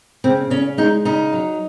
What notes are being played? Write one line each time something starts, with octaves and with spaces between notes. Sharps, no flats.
C#3 C4
C#3 C#4
G#3 D#4
C#3 D#4
F#3